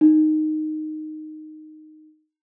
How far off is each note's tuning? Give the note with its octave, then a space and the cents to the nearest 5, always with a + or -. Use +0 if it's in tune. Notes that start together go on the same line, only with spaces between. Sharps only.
D#4 -10